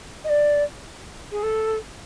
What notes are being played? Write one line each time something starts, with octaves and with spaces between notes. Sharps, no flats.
D#5
D5
G#4
A4